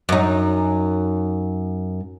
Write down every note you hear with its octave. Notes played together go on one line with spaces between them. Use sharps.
F#2 D#4